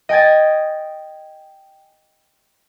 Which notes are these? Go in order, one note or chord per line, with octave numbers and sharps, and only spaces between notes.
D#5 G5 G#5 G#6 A6